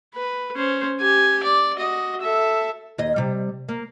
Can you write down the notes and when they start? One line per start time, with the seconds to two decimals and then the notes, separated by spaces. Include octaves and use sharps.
0.15 B4
0.56 C#4 C5
1.00 G4 G#5
1.43 D5
1.76 F#4 D#5
2.22 A4 E5
2.98 D#2 D#5
3.16 C3 G3
3.69 A#3